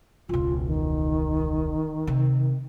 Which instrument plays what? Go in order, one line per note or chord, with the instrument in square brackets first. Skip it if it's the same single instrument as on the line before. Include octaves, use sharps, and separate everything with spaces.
[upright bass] E1 C#2 [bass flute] F4
[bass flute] D#3
[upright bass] C3